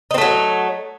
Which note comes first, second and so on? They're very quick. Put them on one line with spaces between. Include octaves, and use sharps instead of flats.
D#4 C4 A3 F#3